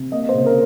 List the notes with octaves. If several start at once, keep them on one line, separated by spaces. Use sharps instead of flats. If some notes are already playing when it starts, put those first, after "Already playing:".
Already playing: C3
A#3 D#5
C5
C#3
A#4